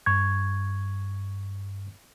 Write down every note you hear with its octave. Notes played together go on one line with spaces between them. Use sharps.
G2 C#6 G#6